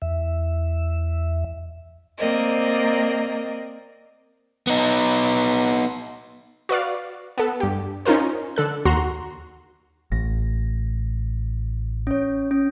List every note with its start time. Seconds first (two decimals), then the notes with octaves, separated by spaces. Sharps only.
0.02 E2 E5
2.17 A#3 C4 A#4 D5 D#5
4.67 B3 D#4
6.69 F#4 B4 D5 F5
7.38 B3 A4
7.60 G2 G4
8.05 C#4 D#4 F4 A#4 C5
8.56 D3 A4 F#6
8.85 D#2 F#4 A#5 C6
10.12 A1 A#6
12.07 C#4 C#5
12.51 C#4